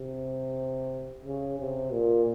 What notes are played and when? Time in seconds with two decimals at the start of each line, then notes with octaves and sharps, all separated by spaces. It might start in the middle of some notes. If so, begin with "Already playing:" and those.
Already playing: C3
1.25 C#3
1.59 C3
1.93 A#2